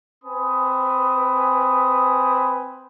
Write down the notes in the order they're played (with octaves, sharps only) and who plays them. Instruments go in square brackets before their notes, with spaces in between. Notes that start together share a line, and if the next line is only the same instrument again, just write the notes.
[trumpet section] C4 B4 G#5 B5 D#6